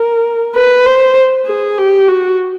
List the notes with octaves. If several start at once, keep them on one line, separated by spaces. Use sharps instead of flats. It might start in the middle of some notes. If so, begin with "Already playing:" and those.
Already playing: A#4
B4
C5
G#4
G4
F#4